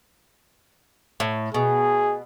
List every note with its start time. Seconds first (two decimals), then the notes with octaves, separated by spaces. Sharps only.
1.20 A2
1.54 B2 G#4